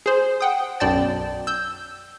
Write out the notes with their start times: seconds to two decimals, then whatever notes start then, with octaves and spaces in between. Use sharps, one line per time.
0.06 G#4 C5
0.41 F#5 G5 D#6
0.80 B1 F#2 D5 G5 A5 A6
1.47 E6 G6